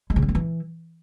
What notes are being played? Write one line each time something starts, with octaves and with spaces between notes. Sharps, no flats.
G#3
C#3
F#3
A#3
E3